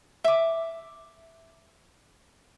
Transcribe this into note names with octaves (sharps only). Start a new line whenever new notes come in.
E5 D6